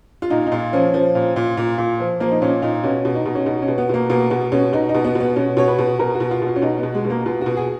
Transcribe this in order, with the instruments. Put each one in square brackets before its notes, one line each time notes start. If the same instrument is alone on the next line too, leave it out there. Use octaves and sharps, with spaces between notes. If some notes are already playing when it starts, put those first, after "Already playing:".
[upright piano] F4
A#2 D#4
D#4
A#2 F4
F3 C#4
F3
A#2
A#2
A#2
A#2
F3
F3 A#3
D#4
A#2 C#4
A#2 D#4
B2 C#4
B2
D#4
B2
C#4
B2 D#4
C#4
B2
B3
B2 A#3
B2 A#3
B2 B3
B2 C#4
B2 D#4
D#4
B2
B3
B2
B3
B2 C#4
B2 C#5
B4
B2
B2 A#4
F#4
B2
F4
B2
F4
C#4
B2 D#4
B2 B3
G#3
B2
A#3
B2 F4
B2 F#4
G#4